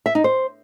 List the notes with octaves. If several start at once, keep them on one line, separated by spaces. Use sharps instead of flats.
E5
D#4
C5